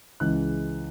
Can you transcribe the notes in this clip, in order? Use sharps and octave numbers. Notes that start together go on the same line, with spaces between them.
C#2 C#3 E3 G#3 F#6